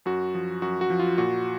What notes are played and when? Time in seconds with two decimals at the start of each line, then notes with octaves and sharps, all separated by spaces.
0.06 F#2 F#4
0.35 F3
0.62 F#2 F#4
0.81 F#4
0.90 F3
1.00 F4
1.18 A#2 F#4